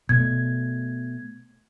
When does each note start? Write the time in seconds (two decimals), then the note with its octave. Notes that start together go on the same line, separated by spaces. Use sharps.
0.09 B2 A3 G#6